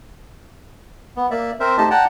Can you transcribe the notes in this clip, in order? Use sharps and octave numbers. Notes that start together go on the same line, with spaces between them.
B3
A#3 D5 E5
C4 A#4 C5 E5
A3 D#4 G4 C5 D#5 A5
D5 F#5 G5 A5 A#5